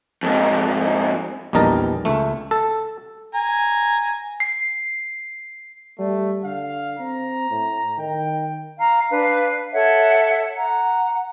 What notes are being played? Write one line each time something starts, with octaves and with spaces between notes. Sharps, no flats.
F2 G#2
A#1 E2 G3 D#4 A#4 A5
C#2 A3
A4
G#5 A#5
C7
G3 A3
D3 F5
C4 A#5
A2
D#3 G5
F5 A#5
D4 B4 F5
A4 C#5 E5 F#5
F#5 A#5